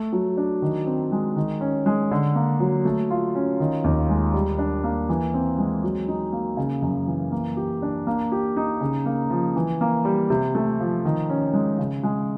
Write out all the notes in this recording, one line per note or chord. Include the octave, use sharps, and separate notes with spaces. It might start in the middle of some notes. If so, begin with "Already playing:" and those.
Already playing: A3
F#3
D4
D#3
C4
G#3
D#3
C#4
G#3
D3
A#3
F#3
A3
F4
C#4
D#3
D#2
G#3
G3
D4
A#3
E3
C4
G#3
F#3
D#4
A#3
C#3
F#2
E3
A#3
G4
D4
A#3
G4
D#4
C#3
A#3
F3
E3
A#3
G3
C3
A3
F3
D#3
C#4
G#3
C#3
G#3